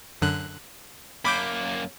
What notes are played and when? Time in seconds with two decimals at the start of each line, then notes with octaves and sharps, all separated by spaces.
0.22 F#2 D3 F#6
1.25 F#2 A#3 B5 D6 G6